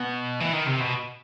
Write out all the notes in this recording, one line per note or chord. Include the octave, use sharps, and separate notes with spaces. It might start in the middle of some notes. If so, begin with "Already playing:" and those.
Already playing: B2
E3
D#3
C3
B2